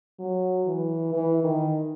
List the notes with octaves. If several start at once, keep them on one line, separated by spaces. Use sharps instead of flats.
F#3
E3
E3
D#3